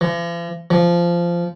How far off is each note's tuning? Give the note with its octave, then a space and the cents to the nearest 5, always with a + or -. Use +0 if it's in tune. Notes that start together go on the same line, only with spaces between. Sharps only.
F3 -45
F3 -15